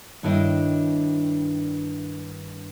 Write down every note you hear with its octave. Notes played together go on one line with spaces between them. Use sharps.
G2 D#3 D4 E4 C#5 D#5